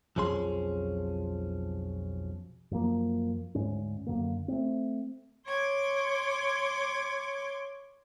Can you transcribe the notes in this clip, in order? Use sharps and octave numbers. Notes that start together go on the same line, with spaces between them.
B1 F2 F3 C#4 G#4 C6
F#2 F3 A#3
D2 G#2 C#4
F#2 D3 A#3
A3 C4
C#5 C6 D6 G#6